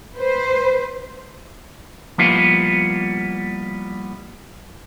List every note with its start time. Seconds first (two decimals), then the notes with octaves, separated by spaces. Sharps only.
0.16 B4 C5
2.18 F3 G3 A#3 B3 E4 F4